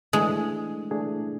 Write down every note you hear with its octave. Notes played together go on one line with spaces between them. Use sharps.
E3 G#3 A3 D4 G#4
E3 A3 D4 G#4